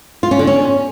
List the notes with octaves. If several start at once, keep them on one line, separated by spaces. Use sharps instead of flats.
F4
C#4
D3
C#4